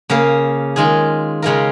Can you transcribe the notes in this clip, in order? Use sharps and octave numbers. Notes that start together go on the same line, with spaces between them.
C#3 A#3 C#4 A#4
D#3 G#3 F4 G#4
C#3 G#3 F4 A#4